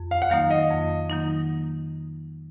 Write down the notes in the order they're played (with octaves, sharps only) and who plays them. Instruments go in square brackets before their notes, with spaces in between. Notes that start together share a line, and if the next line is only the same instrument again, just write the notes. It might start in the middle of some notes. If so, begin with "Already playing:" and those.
Already playing: [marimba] F2
[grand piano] F5
F#5
[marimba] D#3 F#3 A#3 D#4 [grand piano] F5
[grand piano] D#5
[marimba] F2
D#3 F#3 A#3 D#4